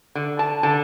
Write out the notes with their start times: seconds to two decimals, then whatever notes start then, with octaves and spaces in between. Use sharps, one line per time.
0.15 D3
0.39 A5
0.63 D3 A5